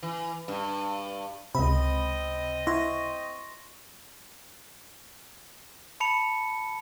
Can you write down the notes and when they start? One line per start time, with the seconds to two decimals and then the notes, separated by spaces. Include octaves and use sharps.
0.03 E3
0.48 G2
1.55 C#2 C3 C4 D#5 B5
2.67 E4 C6 C#6 A#6
6.00 A5 B5 C#7 F7